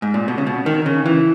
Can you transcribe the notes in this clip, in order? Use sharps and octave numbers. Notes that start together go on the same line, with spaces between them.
G#2
A#2
B2
C#3
B2
D#3
C#3
E3